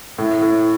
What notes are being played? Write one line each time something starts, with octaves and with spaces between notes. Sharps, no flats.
A2
A2